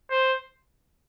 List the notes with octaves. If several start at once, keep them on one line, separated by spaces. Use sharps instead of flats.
C5